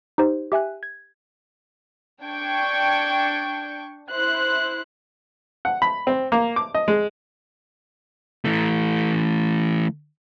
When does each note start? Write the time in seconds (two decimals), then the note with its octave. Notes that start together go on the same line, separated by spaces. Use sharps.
0.18 D#4 G4 C5
0.52 G4 E5 G#5 F#6
0.83 G#6
2.24 D4 G5 C#6 G6 G#6 D7
4.10 E4 C5 F#6
5.65 F#5
5.82 B5
6.07 C4
6.32 A#3
6.56 D6
6.74 D#5
6.88 G#3
8.45 E3 A3